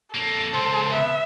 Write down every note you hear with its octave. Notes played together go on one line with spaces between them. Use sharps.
F2 A#3 A4
C#2 C4 C5
B3 E5